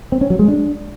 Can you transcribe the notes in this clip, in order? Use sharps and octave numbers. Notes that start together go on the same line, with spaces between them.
C4
C#4
F#3
G#3
D4